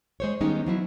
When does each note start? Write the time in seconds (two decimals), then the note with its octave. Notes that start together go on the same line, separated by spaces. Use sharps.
0.20 G#3 C5 C#5
0.41 D#3 G3 G#3 B3 C#4 D#4
0.66 F3 F#3 E4